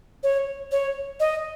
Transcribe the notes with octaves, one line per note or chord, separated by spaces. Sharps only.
C#5
C#5
D#5